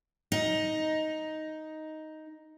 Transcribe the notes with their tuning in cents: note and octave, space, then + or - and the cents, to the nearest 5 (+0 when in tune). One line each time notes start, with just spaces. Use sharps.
D#4 +5